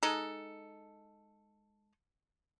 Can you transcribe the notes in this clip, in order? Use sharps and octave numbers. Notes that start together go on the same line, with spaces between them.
G#3 D#4 A4